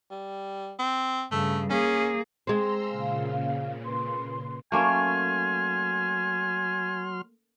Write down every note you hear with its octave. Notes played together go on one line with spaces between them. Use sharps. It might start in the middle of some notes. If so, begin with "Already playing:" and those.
G3
C4
G2 C#3 A3
A#3 C#4 G#4
G#3 C4 A#5 C6 E6
A#2 C#3 F5
B4 C6
F#3 A3 A#3 C#4 G#5 C6 F6